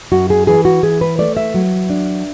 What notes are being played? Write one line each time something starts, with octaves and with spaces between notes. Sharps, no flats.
F#2 F#4
G#4
E3 G#4
F#4
E3 G#4
B4
A3 D5
E5
F#3
D4